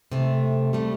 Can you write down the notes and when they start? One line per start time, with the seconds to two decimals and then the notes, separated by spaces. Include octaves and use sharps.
0.12 C3 A3
0.73 G3 A3